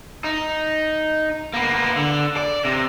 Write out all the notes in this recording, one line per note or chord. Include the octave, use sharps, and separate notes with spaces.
D#4
A#3 B3
D3
D5
C3